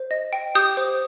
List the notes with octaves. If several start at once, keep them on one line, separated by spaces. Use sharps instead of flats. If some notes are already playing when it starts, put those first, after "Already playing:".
Already playing: C5
D#5
G5
G4 D#6 G6
C5